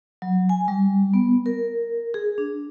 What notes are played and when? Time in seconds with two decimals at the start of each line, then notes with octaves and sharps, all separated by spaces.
0.22 F#3
0.49 G#5
0.68 G3
1.14 B3
1.46 A#4
2.14 G#4
2.38 D4